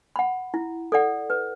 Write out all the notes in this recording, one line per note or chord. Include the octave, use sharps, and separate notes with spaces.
F#5 B5
E4
A4 D5 F#5
B4